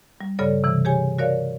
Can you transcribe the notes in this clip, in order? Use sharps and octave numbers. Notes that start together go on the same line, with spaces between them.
G3
G2 C#3 G3 A4 C#5 D5
C3 E3
G4 G#4 C#5 G#5
F#4 A#4 C#5 D5 F5